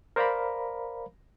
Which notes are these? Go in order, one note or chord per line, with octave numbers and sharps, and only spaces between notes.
A#4 C5 D5 F5 A#5 B5